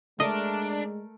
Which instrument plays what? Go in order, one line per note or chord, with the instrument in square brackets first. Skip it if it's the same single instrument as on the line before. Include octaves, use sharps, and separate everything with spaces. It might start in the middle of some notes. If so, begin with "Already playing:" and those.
[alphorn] G#3 [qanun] A3 A#4 D5 [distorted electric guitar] D4 [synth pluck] D#5